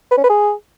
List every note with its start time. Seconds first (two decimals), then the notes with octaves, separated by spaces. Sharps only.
0.12 B4
0.18 C#4
0.24 B4
0.30 G#4